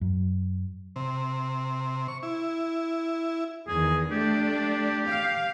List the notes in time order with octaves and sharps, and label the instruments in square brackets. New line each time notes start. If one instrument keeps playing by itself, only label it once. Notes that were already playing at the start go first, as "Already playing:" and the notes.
[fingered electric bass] F#2
[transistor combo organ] C3
C#6
E4
[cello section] E2 D#3 [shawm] G#4
[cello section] A3 D4 [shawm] G4
[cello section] F5